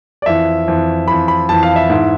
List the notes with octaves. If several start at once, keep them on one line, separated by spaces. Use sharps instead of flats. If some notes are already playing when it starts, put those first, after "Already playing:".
D5
F2 E3 E5
F2 E3
F2 E3 B5
B5
F2 E3 A5
F5
E5
G#2 E3